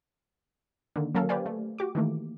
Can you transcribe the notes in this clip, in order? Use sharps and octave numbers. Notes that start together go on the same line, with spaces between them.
D3 D#3 A#3
F#3 A#3 C#4 A4 A#4 F5
G4 B4 C5 D5 F5 G#5
A3
F#4 G4 D6
D#3 E3 A3 A#3